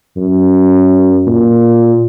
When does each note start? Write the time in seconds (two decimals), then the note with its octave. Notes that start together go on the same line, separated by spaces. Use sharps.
0.17 F#2
1.26 A#2